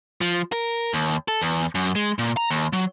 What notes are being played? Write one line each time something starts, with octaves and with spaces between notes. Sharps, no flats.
F3
A#4
D#2
A4
E2
F#2
G#3
A#2
A#5
D#2
F#3